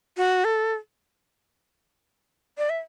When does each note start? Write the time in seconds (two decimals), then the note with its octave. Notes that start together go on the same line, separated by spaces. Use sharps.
0.17 F#4
0.45 A4
2.58 D5
2.70 E5